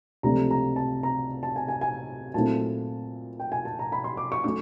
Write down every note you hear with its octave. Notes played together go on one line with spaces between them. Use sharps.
C#2 C3 F3 A3 D4 A#5
A#5
A5
A#5
A5
G#5
G#5
G#5
A#2 F#3 A3 C4 E4 A5
G5
G#5
A5
A#5
B5
C6
D6
C#6
F#3 A3 C#4 C#6